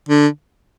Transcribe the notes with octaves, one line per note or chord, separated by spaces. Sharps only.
D3